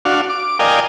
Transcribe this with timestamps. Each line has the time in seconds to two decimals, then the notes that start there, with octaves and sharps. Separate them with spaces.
0.05 D4 F#4 F5
0.30 D6
0.59 A#4 D5 D#5 F5 G5 G#5